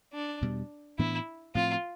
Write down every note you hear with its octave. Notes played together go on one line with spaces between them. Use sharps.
D4
E2 B2 G3
A2 E3 B3 D4 E4
A2 F3 C4 F4